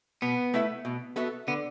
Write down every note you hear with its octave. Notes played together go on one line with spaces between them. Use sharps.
B2 B3
A3 E4 B4 E5
B2
B3 F#4 A4 E5
D3 B3